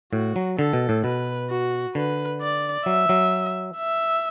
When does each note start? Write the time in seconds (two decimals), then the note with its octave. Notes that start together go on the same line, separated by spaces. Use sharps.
0.12 A2 F#4
0.36 F#3
0.58 D3 A4
0.73 B2
0.89 A2
1.04 B2 B4
1.50 F#4
1.95 D3 B4
2.41 D5
2.86 F#3 E5
3.09 F#3
3.77 E5